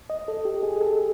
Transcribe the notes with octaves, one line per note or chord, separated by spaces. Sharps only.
D#5
A4
G4
G#4
G#4
A4